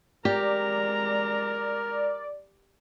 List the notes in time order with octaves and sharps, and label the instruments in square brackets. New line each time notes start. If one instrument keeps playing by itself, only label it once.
[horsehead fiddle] G#3 A#5 [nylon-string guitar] G4 [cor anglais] A#4 [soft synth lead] D5